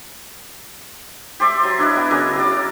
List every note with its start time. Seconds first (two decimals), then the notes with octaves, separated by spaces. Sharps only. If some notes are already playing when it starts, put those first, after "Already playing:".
1.40 G4 C5 D5 E5
1.63 F#3
1.79 D4 E4 B4 D#5
1.95 B3
2.10 C#3 F#3 A#4 D6
2.36 F#3 D5